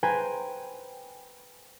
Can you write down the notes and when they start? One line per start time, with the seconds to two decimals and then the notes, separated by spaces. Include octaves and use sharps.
0.03 B4 C5 G5 G#5 A#5